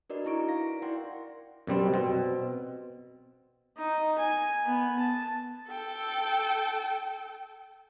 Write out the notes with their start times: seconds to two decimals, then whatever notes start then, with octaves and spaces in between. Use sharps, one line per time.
0.10 D4 F#4 A#4 B4 D5 D#5
0.25 D#4 E4 A#5 C#6 D7
0.49 F5 A#6
0.82 E4 A#4 D5 F#5 G5 C6
1.67 F#2 B2 G3 C4
1.94 B2 C4
3.78 D#4
4.18 G#5
4.66 B3
4.99 A5
5.68 A4 G5